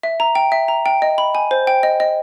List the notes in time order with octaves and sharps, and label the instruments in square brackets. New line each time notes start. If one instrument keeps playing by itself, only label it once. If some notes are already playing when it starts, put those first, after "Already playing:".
[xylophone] E5
A#5
G5
E5
A#5
G5
D#5
B5
G#5
C5
G5
D#5
D#5